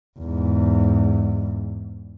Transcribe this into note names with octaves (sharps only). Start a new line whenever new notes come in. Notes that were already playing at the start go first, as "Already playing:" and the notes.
E2 G#2